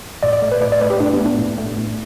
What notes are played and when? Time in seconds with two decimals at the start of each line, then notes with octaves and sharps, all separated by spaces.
0.23 A2 D5
0.33 D5
0.42 A3
0.52 B4
0.61 A2 D5
0.72 D5
0.81 A3 B4
0.90 G4
1.00 A2 D4
1.14 B3
1.20 A3
1.26 D4
1.39 A2
1.58 A3
1.77 A2